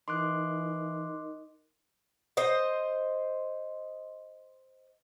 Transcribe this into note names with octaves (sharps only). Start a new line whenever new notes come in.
E3 D#4 A#4 D#5 C6 D6 F#6
C5 D#5